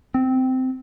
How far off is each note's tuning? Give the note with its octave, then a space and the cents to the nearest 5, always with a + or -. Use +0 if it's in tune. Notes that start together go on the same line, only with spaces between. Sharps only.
C4 -15